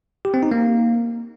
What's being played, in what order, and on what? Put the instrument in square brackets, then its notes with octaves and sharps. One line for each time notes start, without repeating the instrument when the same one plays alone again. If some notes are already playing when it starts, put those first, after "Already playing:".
[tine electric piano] G4
C4
D#4
A#3